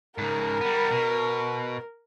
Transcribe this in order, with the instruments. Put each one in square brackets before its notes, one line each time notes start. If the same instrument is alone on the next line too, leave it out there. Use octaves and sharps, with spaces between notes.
[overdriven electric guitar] G#2 C#3 [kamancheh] A#4
[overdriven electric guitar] G3 B3
B2